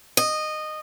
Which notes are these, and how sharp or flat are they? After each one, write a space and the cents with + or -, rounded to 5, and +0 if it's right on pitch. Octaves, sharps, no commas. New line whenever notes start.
D#5 -15